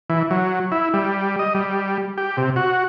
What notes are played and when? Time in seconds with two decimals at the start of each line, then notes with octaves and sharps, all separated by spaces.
0.10 E3
0.31 F#3
0.72 E4
0.94 G3
1.39 D#5
1.55 G3
2.18 G4
2.37 C3
2.56 F#4